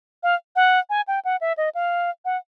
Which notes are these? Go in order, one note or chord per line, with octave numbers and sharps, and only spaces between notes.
F5
F#5
G#5
G5
F#5
E5
D#5
F5
F#5